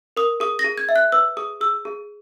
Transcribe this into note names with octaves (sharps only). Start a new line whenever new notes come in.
A#4 D#6
G#4 D#6
A#6
G#4
G#6
E5
F#6
B4 E6
G#4 D#6
G#4 E6
G#4